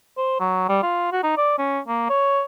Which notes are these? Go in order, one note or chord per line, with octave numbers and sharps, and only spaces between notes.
C5
F#3
G3
F4
F#4
D#4
D5
C#4
A#3
C#5